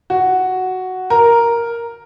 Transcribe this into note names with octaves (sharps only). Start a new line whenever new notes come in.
F#4
A#4